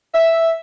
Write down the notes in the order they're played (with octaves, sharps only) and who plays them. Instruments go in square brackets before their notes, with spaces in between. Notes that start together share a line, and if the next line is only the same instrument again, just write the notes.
[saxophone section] E5